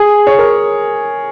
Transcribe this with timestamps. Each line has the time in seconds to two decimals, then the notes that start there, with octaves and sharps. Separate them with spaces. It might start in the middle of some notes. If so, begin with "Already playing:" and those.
Already playing: G#4
0.27 C#5
0.39 A#4